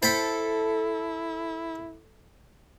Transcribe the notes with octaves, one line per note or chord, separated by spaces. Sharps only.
E4 A4 C5 G5 B5